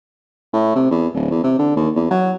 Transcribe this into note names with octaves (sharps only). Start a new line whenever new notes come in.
A2
C3
E2
D1
E2
C3
D3
D#2
E2
F#3